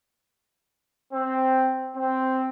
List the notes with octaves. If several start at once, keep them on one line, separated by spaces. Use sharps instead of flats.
C4
C4